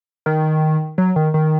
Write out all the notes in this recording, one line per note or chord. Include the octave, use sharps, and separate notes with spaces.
D#3
F#3
D#3
D#3